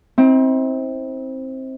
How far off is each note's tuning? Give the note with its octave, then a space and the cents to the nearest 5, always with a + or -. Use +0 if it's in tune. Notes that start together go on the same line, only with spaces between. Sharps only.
C4 +10 E4 -45